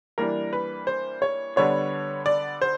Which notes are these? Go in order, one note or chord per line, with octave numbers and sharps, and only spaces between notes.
E3 G3 A#3 D4 A#4
B4
C5
C#5
D3 G3 B3 D4 C#5
D5
C5